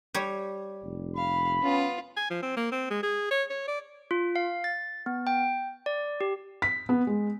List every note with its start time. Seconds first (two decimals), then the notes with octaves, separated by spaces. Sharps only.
0.14 G3 C#5
0.83 F1
1.17 F5 B5
1.62 B3 C#4 F4
2.17 G#5
2.30 F3
2.42 C4
2.57 A#3
2.72 C4
2.90 G#3
3.03 G#4
3.31 C#5
3.50 C#5
3.68 D5
4.11 F4
4.36 F5
4.64 A6
5.06 B3
5.27 G5
5.86 D5
6.21 G4
6.62 B6
6.89 B3
7.07 G#3